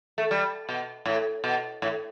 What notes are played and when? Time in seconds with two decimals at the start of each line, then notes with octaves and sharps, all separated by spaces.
0.18 A3
0.31 G3
0.69 B2
1.05 A2
1.44 B2
1.82 A2